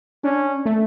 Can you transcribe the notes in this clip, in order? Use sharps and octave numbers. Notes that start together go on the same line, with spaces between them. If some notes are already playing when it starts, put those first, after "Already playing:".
C#4 D4
A3